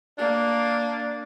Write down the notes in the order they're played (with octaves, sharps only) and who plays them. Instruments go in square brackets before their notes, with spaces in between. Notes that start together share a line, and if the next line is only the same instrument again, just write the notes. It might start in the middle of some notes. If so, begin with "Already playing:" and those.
[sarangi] A#3 [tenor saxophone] D4